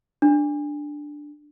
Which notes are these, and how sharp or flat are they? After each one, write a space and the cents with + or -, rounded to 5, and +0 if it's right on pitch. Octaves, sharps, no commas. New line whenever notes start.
D4 +5